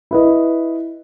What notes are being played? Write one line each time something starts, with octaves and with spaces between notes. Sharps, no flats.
E4 B4 D#5